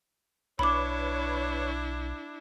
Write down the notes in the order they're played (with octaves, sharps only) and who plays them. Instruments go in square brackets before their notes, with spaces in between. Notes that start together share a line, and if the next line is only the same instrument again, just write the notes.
[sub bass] B1 [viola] D4 E4 [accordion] B4 C#5 C#6 [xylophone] B5 D6